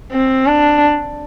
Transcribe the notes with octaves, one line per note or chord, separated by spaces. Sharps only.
C4
D4